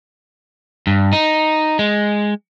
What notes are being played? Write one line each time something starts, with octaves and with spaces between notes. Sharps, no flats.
G2
D#4
G#3